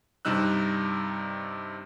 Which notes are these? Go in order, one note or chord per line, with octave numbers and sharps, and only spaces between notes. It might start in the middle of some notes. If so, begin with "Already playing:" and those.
G2 C3 G3 D#4 E6 F#6